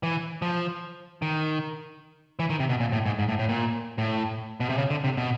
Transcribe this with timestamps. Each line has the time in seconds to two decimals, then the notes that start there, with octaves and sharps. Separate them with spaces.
0.03 E3
0.42 F3
1.22 D#3
2.39 E3
2.50 D#3
2.60 C3
2.69 B2
2.80 A#2
2.92 A2
3.06 G#2
3.19 G#2
3.29 A2
3.39 A2
3.49 A#2
3.98 A2
4.60 B2
4.69 C3
4.78 C#3
4.90 D3
5.04 C3
5.17 B2